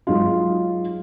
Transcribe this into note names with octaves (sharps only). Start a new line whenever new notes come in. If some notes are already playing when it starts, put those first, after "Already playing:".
F#3 G#3 D#4 F4